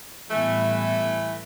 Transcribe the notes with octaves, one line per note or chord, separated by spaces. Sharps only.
A2 E3 G3 A3 B3